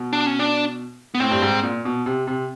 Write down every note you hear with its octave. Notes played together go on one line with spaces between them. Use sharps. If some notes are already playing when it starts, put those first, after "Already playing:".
Already playing: B2
D4
C#4
D4
B3
A2 C4
G2
G#2
A#2
B2
C3
C3